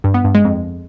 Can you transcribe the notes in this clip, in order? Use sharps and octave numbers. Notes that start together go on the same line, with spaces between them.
G2
B3
G2
G#3
F2